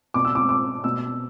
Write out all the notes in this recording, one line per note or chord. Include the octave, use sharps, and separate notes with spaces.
B2 D6
E6
D6
D6
B2 E6